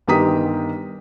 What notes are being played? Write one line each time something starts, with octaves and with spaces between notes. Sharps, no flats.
G1 D#3 G4 A#5 D#6 B6